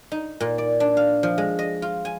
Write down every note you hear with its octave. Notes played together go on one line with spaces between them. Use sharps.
D#4
A#2
D5
D4
F5
F3
G#3
D#5
F4
G#5